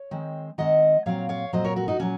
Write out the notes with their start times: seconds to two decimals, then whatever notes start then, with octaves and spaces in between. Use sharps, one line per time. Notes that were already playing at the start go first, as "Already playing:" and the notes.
Already playing: C#5
0.11 D#3 G#3 C4
0.58 D#3 G#3 C4 D#5 F#5
1.06 A#2 F#3 C4 C#5 F5
1.29 C#5 F5
1.53 A#2 F#3 C4 C5 D#5
1.64 A#4 C#5
1.76 F#4 A#4
1.88 D#4 F#4
2.00 A#2 F#3 C#4